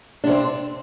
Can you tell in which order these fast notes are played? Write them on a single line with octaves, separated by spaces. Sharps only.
D4 C3 C4